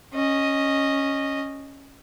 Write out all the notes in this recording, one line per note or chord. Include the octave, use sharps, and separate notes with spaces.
C#4 D#5